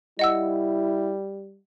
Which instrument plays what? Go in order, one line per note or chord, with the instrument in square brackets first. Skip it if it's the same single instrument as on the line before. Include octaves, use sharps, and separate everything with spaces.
[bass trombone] G3 [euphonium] E4 [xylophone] D#5 F#5 E6